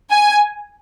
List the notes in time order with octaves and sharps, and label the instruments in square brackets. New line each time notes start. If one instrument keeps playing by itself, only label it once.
[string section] G#5